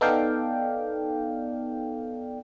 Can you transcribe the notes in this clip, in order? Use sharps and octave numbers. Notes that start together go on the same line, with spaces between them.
B3 D#4 A4 D5 F5 G5